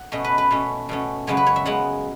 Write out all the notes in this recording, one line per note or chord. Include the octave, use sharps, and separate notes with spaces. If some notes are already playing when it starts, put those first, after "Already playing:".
Already playing: F#5
B2 A3 C#4 D#5
B4
B4
B2 A3 C#4
B2 A3 C#4
F#2 C#3 G#3 B3 C#5
B4
C#5
E5
F#2 C#3 G#3 B3 F#5